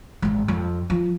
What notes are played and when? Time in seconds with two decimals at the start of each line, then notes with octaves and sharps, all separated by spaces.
0.22 G#1 G#2
0.48 F2
0.90 F3